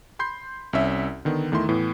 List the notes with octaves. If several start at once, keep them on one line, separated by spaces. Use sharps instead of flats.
B5 C6 G6 C7
C2 C#4 E5
D3 D#3 B3
E2 D#3 A3 E4 C6
A2 E3 B3